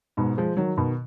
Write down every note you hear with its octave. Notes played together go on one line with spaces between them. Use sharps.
G#2 B2
F3 G#3
D#3 F#3
B2 D#3